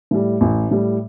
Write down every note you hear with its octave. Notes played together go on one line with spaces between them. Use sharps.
A2 G3
A1
A2 G3